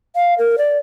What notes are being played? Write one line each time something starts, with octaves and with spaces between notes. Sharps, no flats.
F5
A#4
D5